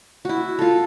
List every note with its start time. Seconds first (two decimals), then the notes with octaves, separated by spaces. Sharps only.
0.25 E4 F#4
0.59 F4 A4